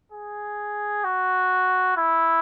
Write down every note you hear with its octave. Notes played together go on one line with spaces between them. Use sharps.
G#4
F#4
E4